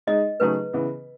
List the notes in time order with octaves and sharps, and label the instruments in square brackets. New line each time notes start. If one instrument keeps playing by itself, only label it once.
[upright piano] G#3 D#4 G#4 [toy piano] D#5
[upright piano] C#3 F#3 A3 D#4 G#4 [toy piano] B4
[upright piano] C#3 E3 B3